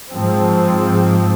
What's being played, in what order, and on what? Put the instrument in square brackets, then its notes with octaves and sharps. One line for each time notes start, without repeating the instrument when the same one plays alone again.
[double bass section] G#2 F3 C4